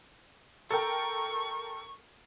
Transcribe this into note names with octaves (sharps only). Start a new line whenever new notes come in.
A4 A#4 G5 C#6